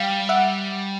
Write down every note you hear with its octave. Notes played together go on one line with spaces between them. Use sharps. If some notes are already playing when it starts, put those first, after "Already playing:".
Already playing: G3 F5 G5
E5 F#5